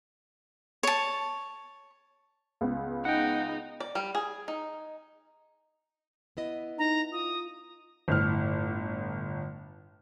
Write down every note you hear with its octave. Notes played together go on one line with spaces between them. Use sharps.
C#5 A5
C#2 B3
D#4 F#5 G5
D5
G3
G#4
D#4
B3 E4 D#5
D#4 A#5
F4 D#6
G1 A2 F6